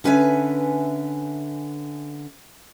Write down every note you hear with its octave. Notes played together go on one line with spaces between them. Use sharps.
D3 C#4 B4 E5 F5 G#5